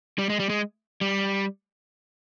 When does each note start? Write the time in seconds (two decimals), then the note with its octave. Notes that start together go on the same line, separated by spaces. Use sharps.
0.18 G3
0.30 G#3
0.40 G3
0.50 G#3
1.01 G3